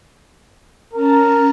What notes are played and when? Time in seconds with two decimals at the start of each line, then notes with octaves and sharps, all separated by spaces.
0.93 C#4 A#4 A5 A#5